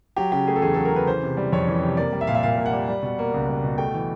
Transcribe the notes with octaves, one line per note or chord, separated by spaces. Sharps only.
F#3 G4
C#3 G4
A3 G#4
A4
E2 G#4
F#3 A4
A#4
C#3 B4
E3 C5
C3
G3
F2 C#5
E3
C3
A#3 D5
G3
E5
A#2 F5
E5
A#2 F5
A#3
F#5
G3
G3
B2
A#3
C#2
G3
B2
A3 G5
E3